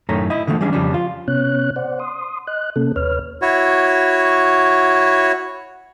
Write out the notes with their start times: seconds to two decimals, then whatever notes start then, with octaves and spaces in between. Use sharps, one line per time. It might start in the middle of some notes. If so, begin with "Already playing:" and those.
0.09 F#2 A2 D#3 A3 C#4 A#5
0.30 E4 D#5
0.47 D3 D#3 F3 G#3 A3
0.61 E3 G3 G#3 C#4 D4
0.73 F2 C#3 F3 G3 C#4 D4
0.94 F4
1.28 C3 B3 C#4 C#5 F#6
1.76 C5 D5 F#5
2.00 C6 D#6
2.47 D#5 F#6
2.76 C3 A#3 C#4 A4
2.96 D#2 B4 C#5 F6
3.42 E4 F#4 C#5